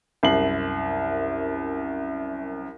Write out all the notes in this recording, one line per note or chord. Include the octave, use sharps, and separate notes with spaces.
C2 F#2 C7 F#7